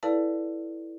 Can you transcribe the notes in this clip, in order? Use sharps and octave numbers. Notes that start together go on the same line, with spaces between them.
E4 A4 B4 D5 F5 A5